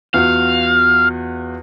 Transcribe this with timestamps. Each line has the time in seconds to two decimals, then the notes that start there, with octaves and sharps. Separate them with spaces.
0.14 E2 F4 F#4 F5